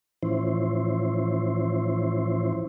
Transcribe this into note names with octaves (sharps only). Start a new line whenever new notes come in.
A2 E3 F3 C#4 E4 C5